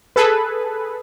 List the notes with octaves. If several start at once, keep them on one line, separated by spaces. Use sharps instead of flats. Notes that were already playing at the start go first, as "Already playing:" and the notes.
G#4 A4 B4